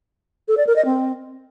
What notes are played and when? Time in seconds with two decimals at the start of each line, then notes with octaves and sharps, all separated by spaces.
0.48 A4
0.57 D5
0.67 A#4
0.76 D#5
0.85 C4